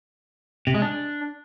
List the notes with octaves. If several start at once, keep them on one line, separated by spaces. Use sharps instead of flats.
C3
G#3
D4